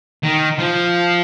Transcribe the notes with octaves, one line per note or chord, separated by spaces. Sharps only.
D#3
F3